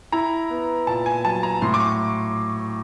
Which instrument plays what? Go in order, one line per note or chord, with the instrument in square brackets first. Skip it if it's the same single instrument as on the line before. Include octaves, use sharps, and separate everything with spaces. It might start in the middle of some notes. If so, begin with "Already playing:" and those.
[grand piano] E4 [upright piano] A#5
[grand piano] B3
[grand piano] A#2 [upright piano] A5
[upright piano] G#5
[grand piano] F#3 [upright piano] A5
[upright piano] A#5
[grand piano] A2 [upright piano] C6
[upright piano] D6
C#6